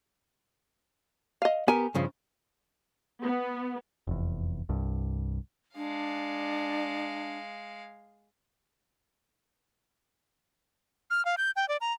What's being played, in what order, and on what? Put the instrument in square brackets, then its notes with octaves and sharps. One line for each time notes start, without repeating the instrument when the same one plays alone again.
[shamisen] D#5 F5
[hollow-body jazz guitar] B3 G4 A#4 [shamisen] G#5
[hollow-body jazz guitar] G2 C#3 F3
[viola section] B3
[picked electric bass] F1 E2
C2 G2
[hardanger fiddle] G#3 F5 [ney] D4
[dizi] F6
F5
G6
G5
D5
A#5